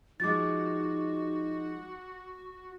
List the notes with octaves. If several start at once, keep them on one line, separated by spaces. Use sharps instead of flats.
F3 G#3 D#4 F#4 D6 A6